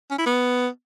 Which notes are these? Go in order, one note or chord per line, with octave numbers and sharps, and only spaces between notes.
C#4
E4
B3